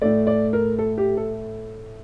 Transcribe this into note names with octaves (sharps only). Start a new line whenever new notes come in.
A2 A3 D5
D5
A#4
A4
G4
A4